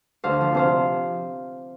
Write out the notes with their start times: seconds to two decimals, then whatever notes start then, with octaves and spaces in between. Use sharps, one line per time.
0.24 D2 C5 F5
0.41 F3
0.55 C3 C5 F5